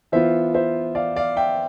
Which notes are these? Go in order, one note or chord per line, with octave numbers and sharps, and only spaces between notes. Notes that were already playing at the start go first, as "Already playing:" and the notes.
E3 B3 F4 C5 E5
C5 E5
D5 F5
D5 F5
E5 G5